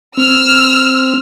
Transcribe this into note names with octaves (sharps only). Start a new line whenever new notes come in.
C4 E6 F6